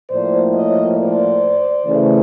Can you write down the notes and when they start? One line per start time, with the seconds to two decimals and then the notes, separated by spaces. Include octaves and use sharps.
0.10 A2 F3 A#3 C5 D5
0.54 C#5 D#5
0.98 C5 D5
1.86 C#3 E3 A3